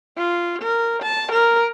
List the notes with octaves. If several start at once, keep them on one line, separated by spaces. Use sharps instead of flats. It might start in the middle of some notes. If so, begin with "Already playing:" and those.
F4
A#4
A5
A#4